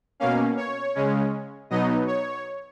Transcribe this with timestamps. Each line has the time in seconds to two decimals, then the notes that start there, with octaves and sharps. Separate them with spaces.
0.20 B2 A#3 C#4 F5
0.57 C#5
0.95 C#3 G#3 C#4
1.70 B2 F#3 B3 D#4 D#5
2.07 C#5